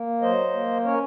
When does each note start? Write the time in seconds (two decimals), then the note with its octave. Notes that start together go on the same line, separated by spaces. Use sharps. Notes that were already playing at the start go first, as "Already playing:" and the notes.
Already playing: A#3
0.22 F#3 C5 D#5
0.53 A#3
0.84 C#4 A#4 C#5